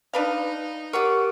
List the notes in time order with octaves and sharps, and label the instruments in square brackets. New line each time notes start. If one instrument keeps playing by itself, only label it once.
[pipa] D4 B4 F5 [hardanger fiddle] D#4
[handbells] G4 A#4 [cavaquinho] C#5 F#5 D6